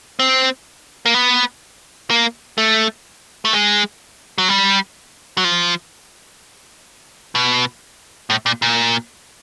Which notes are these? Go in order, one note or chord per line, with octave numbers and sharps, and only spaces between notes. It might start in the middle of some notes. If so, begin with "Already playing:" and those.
C4
A#3
B3
A#3
A3
A3
G#3
F#3
G3
F#3
F3
B2
A2
A#2
A#2